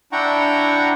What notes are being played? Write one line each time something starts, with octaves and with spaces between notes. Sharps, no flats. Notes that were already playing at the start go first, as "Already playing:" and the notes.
D4 E4 F#5 G5 A#5 C#6